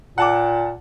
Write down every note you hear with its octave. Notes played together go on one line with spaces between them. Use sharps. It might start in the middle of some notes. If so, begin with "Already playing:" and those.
A#2 F#5 A5 D6